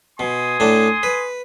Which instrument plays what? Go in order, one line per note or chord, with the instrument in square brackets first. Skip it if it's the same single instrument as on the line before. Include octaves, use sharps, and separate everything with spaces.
[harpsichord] B2 [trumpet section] G#5 C6 D#6
[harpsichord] A2 D4
B4